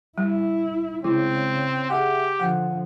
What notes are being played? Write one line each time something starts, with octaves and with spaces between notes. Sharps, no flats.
G3 E4
C#3 G#3 C4 E4
G4 G#4 E5 F#5
D3 F3 F#5